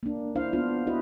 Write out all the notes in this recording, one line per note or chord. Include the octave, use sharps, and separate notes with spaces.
A#3 D4
D4 E4 C5 F5
B3 D4 F4
E4 F#4 B4 D#5